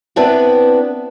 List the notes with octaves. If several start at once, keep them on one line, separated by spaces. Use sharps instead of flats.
B3 C4 D4 E4 B4